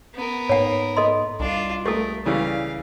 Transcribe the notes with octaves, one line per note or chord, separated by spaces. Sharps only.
B3 A#4
G#2 C#5 F#5
A4 D#5 C6
C2 D4 F4
A3 G4 A4 A#4
C#3 E3 G3 F5